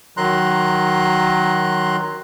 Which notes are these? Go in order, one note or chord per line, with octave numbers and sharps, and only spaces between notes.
D#3 F#3 A#5 C6 F#6